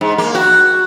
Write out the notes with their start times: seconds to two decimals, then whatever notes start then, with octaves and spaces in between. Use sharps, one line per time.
0.01 G#2
0.18 A#3
0.35 F#4